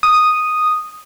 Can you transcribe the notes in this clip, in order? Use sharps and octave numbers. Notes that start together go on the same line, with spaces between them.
D#6